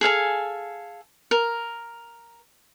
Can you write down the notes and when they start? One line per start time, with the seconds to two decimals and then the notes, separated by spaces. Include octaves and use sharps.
0.01 G#4 A4 F5 G#5
1.31 A#4